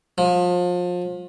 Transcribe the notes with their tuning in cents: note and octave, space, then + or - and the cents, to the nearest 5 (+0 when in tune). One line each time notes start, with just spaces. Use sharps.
F3 +30